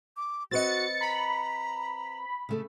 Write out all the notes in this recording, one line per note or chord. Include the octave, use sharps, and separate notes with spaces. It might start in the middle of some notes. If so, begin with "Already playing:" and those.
D6
C4 F#4 B4 D#5 A6 C#7
A#5 B5
C#3 A3 A4